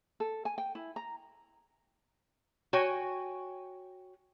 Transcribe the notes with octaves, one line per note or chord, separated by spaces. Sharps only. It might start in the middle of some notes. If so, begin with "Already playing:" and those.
A4
G#5
G5
E4
A#5
F#4 C#5 G5 G#5